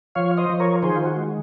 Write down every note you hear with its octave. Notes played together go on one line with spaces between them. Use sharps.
F3 C#5 F5
C5 D#5
F3
A#4 C#5
D#3 G#4 C5
F4
F#4
G#3